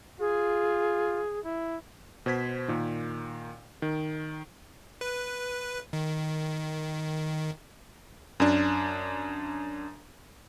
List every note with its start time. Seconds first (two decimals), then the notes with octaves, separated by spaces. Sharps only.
0.20 F4 G#4
1.45 E4
2.26 B2 C5 G#6 B6
2.68 A#2 D#3
3.82 D#3
5.01 B4
5.93 D#3
8.40 F#2 D4